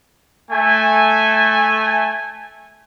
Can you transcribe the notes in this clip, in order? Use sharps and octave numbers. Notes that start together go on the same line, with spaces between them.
A3 G#5